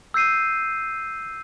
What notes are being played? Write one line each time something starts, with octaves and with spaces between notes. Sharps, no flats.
E6 G6 C7 D#7